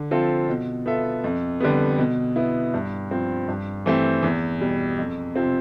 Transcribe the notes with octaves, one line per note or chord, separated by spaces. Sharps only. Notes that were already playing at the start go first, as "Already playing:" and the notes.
Already playing: D3
F3 C4 F4 A4
B2
B3 F4 A4 E5
F2
D3 G3 B3
B2
B3 E4
G2
F3 C4
G2
E3 A3 C4 G4
E2
B2 G3
F2
C3 F3 C4